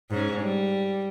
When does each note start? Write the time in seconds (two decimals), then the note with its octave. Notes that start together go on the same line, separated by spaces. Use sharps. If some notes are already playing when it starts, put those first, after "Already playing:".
0.10 G#2 C#4
0.42 G3